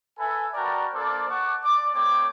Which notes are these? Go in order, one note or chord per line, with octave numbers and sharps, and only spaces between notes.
A4 B4 E5 G#5
F#4 A#4 B4 D5 G5 A5
A#3 D4 A4 C5 D5
F#5 A5 C#6 D6
D5 D6
A3 C4 C#5 D6